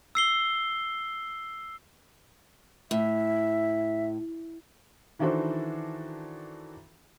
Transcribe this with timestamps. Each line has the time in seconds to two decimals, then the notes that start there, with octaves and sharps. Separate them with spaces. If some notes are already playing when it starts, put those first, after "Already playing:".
0.15 E6 C7 G7
2.91 A2 E5
5.19 D#3 E3 D4 F#4 A4 C5